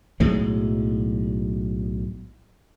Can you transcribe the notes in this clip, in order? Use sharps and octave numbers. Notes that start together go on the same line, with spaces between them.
B1 A2 F#3 G#3